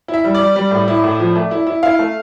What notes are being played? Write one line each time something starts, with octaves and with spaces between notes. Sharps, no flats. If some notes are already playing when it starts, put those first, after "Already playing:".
E4
E5
G3
D5
G3
G3
A2
E4
A2
F3
A3
E4
E4
E4 F5
A3